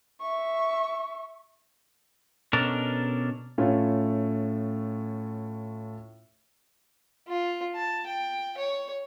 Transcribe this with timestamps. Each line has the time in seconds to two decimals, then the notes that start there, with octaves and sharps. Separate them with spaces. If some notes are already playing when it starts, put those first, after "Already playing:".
0.21 E5 C#6
2.53 B2 C#4 D4 A4 A#4
3.58 A2 A3 C#4 F4
7.28 F4
7.75 A5
8.06 G5
8.57 C#5